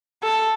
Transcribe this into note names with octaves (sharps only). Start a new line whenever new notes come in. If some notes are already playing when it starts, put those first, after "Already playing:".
A4